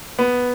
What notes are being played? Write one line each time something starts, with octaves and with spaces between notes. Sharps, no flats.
B3